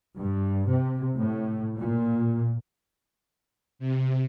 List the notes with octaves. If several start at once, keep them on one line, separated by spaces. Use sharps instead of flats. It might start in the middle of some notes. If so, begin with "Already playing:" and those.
G2
C3
A2
A#2
C3